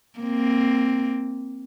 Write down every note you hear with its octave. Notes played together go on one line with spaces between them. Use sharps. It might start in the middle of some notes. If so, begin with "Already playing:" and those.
A#3 C4